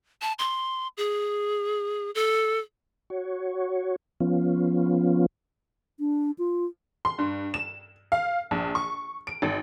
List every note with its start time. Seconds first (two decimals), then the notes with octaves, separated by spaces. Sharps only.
0.22 A5
0.39 C6
0.97 G#4
2.15 A4
3.10 F#4 C#5
4.20 F3 B3 C#4 F4
6.00 D4
6.38 F4
7.05 C6
7.18 G2
7.54 E7
8.12 F5
8.51 A#1
8.75 C#6
9.27 D7
9.42 G#1